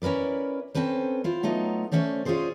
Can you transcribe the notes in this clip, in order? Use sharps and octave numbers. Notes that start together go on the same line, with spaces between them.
C#4 E4 A#4 B4 D5
C4 C#4 A4 B4 C5
E4 F4 C5
F#3 A3 B3 D#4 F4
A3 A#3 C#4 A4 C5 D5
C#4 F4 F#4 G#4 C5 D5